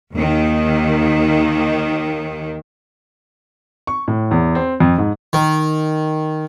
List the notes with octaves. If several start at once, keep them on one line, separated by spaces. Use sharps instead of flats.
D#2 D#3
C#6
A2
E2
C4
F2
G#2
D#3